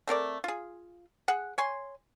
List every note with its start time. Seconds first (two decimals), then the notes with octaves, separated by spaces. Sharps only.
0.08 A3 C4 A#4 D5
0.44 F4 G#4
1.28 G#4 F#5
1.58 C#5 G#5 C6